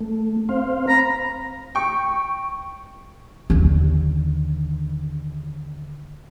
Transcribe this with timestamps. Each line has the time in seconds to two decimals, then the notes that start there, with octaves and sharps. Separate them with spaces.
0.01 A3
0.49 C4 C5 F5
0.88 A#5 B5
1.75 G5 C#6
3.50 D#2 D3